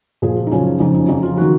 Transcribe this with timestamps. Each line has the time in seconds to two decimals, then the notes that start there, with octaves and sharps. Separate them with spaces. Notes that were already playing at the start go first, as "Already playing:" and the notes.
0.22 A#2 F3 G#4
0.37 F4
0.47 D#4
0.52 F#2 C#3 F3 C#4
0.80 F2 C#3 F3 D#4
0.94 D#4
1.08 F2 C#3 F3 D#4
1.23 F4
1.38 D#3 F#4